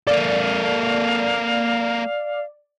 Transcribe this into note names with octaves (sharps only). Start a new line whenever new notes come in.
A#3 A4 D5 F5